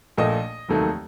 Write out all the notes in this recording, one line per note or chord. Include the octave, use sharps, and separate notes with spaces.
A#1 A#2 A3 D#5
F1 D#2 D#3 F#3 A3